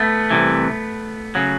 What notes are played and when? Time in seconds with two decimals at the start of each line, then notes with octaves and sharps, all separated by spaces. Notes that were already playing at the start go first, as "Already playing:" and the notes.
Already playing: A3 B3
0.30 C2 C3 E3
1.35 C#3 F#3